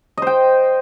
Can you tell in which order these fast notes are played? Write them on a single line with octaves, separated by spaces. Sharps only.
D#5 C5 G5